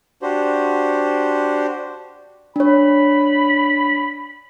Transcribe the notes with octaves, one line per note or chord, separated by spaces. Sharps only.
D4 F#4 G4 C5
D4 C#5 B5